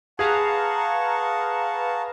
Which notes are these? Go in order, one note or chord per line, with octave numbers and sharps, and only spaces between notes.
G#4 B4 F5 F#5 A5 A#5 C#6